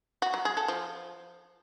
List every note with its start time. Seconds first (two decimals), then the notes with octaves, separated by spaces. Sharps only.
0.22 F#4
0.34 F#3
0.45 G#4
0.57 A4
0.68 F3